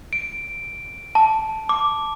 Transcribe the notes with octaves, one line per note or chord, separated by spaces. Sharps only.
D7
A5
D6